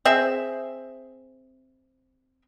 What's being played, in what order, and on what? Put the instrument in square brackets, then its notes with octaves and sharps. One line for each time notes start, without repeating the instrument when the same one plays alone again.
[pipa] C4 G#4 E5